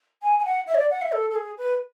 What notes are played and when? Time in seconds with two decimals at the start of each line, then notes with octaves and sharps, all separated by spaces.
0.22 G#5
0.39 G#5
0.45 F#5
0.67 E5
0.74 C#5
0.79 D5
0.90 F#5
1.01 E5
1.12 A4
1.30 A4
1.35 G#4
1.58 B4